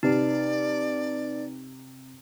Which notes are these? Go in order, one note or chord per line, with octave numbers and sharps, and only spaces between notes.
C3 D#4 B4 D5